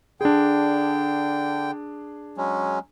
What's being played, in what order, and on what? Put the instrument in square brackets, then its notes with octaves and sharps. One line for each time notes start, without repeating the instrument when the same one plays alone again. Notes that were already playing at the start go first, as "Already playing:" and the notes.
[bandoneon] D3 G5 [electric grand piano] D4 G#4
[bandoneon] F#3 G#3 C#4